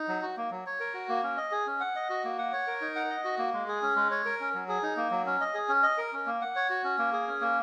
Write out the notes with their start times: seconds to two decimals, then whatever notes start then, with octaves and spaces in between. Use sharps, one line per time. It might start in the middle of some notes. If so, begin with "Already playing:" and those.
Already playing: D#4
0.08 F#3
0.22 F#4
0.37 A#3
0.51 F#3
0.66 C#5
0.80 A#4
0.94 F#4
1.09 A#3
1.23 C#4
1.37 D#5
1.52 G#4
1.67 C#4
1.80 F#5
1.96 D#5
2.10 F#4
2.24 A#3
2.38 F#5
2.53 C#5
2.67 A#4
2.81 D#4
2.96 F#5
3.10 D#5
3.24 F#4
3.38 A#3
3.53 G#3
3.68 G#4
3.82 C#4
3.96 G#3
4.11 C#5
4.25 A#4
4.40 C#4
4.54 F#3
4.68 G#4
4.83 D#4
4.97 A#3
5.11 F#3
5.26 C#4
5.41 D#5
5.54 G#4
5.69 C#4
5.83 D#5
5.98 A#4
6.13 C#4
6.26 A#3
6.41 F#5
6.56 C#5
6.70 F#4
6.84 C#4
6.98 A#3
7.12 G#4
7.28 C#4
7.41 A#3